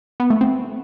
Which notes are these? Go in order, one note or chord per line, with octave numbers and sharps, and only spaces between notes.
B3
A3
C4